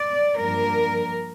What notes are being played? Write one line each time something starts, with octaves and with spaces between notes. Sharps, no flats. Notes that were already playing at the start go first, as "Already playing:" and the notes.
Already playing: D5
G2 F3 A#3 D4 A#4